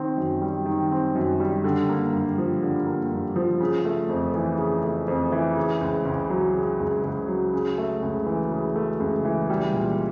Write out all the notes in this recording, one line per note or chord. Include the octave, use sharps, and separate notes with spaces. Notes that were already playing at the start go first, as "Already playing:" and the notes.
Already playing: D#3 C4
F#2
G3
D#3
C4
F#2
G3
D3
A#3
G2
F3
D3
A#3
G2
F3
C#3
A3
F2
E3
C#3
A3
F2
E3
C#3
C#2
C#2
F#3
C#3
C#2
C#2
F#3
C#3
A3
C#2
E3
C#3
A3
C#2
E3
G3
A#2